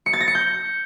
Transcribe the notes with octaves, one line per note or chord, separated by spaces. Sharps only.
C#7
A6
A#6
C#7
G6